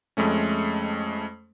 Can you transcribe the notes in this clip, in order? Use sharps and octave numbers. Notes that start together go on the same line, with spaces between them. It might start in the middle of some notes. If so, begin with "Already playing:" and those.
F2 G#3 A3 C#4